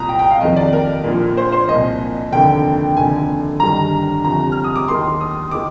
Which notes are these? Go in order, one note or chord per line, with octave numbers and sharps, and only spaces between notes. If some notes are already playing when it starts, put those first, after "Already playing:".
Already playing: C2 A#2 A#5 D#6
G5
G5
F5
F1 F2 D#3 D#5
D5
A#4
A#1 A#2
C5
C5
C2 A#2 D#5
F1 D#2 D3 G5
F1 D#2 D3 G#5
G1 G2 D#3 A#5
G1 F2 C3 A#5
F6
D#6
D6
D#2 D#3 C6
D#6
D#3 D6